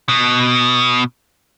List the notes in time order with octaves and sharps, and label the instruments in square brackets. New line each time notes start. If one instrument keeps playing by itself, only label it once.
[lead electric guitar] B2